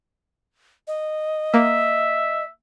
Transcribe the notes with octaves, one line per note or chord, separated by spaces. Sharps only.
D#5
A#3 E5